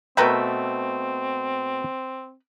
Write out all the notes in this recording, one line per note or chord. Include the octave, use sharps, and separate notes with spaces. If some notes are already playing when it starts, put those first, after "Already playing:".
B2 A3 C4 A#4 B4 E5 G5